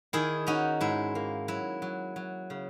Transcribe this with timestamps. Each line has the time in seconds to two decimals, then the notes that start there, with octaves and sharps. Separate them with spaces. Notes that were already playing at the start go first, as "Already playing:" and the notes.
0.13 D#3 E4 G#4
0.47 C#4 D#4 F#4
0.81 G#2 E4
1.15 A#3
1.48 F#3 E4
1.82 F#3
2.16 F#3
2.50 C#3